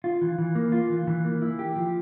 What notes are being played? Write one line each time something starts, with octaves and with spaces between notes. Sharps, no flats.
F4
E3
E3
A#3
F4
E3
E3
A#3
E4
G4
F3